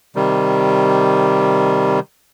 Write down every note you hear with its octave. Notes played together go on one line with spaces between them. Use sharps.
C3 D#3 G3